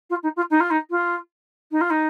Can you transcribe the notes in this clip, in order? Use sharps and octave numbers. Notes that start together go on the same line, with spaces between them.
F4
D#4
F4
D#4
F4
D#4
F4
D#4
F4
D#4